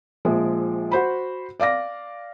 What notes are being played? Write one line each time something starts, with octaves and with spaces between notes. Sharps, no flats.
A#1 F3 G#3
F#4 C5 B5
D5 F5 D6 A#6